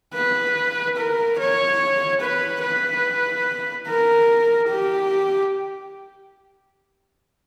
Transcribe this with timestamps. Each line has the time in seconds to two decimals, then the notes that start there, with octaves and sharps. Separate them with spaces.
0.14 B4
0.97 A#4
1.39 C#5
2.21 B4
2.62 B4
3.87 A#4
4.69 G4